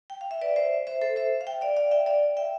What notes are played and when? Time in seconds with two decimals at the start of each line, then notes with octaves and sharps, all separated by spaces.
0.10 G5
0.21 F5
0.31 E5
0.41 B4 D5
0.56 C5 E5
0.87 C5 E5
1.01 A4 C5
1.16 C5 E5
1.41 F5
1.47 E5 G5
1.61 D5 F5
1.76 D5 F5
1.91 E5 G5
2.06 D5 F5
2.37 E5 G5